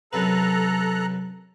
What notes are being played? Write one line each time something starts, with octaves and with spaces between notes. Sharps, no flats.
F#2 C3 A4 B4 A#5 F#6